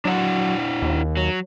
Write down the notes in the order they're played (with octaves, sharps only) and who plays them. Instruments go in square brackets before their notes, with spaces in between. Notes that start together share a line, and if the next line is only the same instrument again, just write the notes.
[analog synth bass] F#3 [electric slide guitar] D4 E4 F#5
[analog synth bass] D#2
[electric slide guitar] F#3